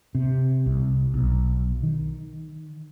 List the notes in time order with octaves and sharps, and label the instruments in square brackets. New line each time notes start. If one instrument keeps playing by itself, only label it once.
[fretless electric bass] C3
C2
B1
D#3